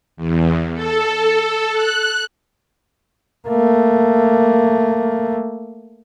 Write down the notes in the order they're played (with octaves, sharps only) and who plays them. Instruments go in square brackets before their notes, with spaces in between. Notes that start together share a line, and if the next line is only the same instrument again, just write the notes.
[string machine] E2
A4
F#6
[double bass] A3 A#3